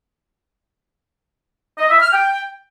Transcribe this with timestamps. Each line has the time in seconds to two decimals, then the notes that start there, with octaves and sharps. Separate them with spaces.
1.78 D#5
1.89 E5
2.01 F6
2.13 G5